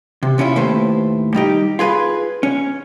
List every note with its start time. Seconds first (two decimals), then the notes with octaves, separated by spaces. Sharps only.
0.23 C3
0.38 B2 C#4 E4 F4
0.56 D#2 A2 A3 B4 C5
1.34 G3 D#4 G4
1.79 F4 G#4 B4
2.43 C#4